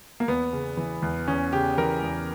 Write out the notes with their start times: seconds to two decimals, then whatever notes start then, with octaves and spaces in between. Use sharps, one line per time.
0.20 A#3
0.28 E2 B3
0.53 C#3
0.77 E3
1.02 E2
1.28 E2 C#4
1.53 C#3 G4
1.78 E3 A#4
2.02 E2